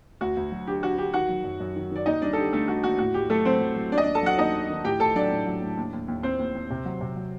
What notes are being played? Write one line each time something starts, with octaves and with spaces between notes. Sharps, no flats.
D2 F#4
D2
F#3
D3 G4
D3 F#4
D3 G4
D#3 F#4 F#5
F#3
F#2
F#2
D#3
D#3 D5
D#2 D#4 D#5
G3 D4 D5
A4
D3 G4
D3 A3 A4
D3 F#4
D#2 F#4
A2 F#4
A2 G4
F#3 A3 A4
F#3 C4 C5
F#3
F#3
D#2 D4 D5
D#5
D#2 D4 D5
A4 A5
F#3 F#4 F#5
D#2 D#4 D#5
D#2
D#3
A2 G4 G5
A2 A4 A5
F#3 D4 D5
A2
F#3
A2
D#2
D#2
D#2
D#2 C4 C5
D#2
D#2
C3
F#3
C3
F#3